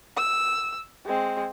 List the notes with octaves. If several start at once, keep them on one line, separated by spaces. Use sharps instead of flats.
E6
G#3 C4